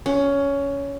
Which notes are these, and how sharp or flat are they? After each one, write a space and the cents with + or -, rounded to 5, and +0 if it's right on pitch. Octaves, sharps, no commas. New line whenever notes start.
C#4 +15